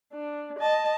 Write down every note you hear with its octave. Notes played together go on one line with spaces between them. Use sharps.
D4
D#5 A5